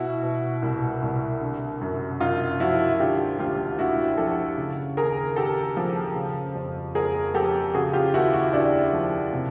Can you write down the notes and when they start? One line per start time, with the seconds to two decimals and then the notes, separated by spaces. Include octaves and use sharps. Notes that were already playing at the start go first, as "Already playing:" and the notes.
Already playing: B2 E4 F#4
0.23 B2
0.62 C2
1.02 C2
1.41 D3
1.81 F#2
2.20 F#2 D#4 F4
2.60 F3 E4 F#4
3.00 D3 F4 G4
3.38 D2 F4 G4
3.79 D2 E4 F#4
4.18 F3 G4 A4
4.57 C#3
4.97 D#2 G#4 A#4
5.36 D#2 G4 A4
5.77 F3
6.15 C#3
6.55 F2
6.95 F2 G#4 A#4
7.34 F3 G4 A4
7.74 C#3 F#4 G#4
7.93 F4 G4
8.14 D#2 E4 F#4
8.33 E4 F#4
8.53 D#2 D4 E4
8.93 F3
9.33 C3